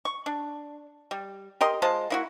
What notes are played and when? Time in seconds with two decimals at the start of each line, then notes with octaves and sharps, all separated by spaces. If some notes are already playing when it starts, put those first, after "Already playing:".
0.05 C#6
0.26 D4
1.11 G3
1.61 G4 A#4 D#5 C6
1.82 G#3 F4 C5 A5
2.10 A#3 E4 F#4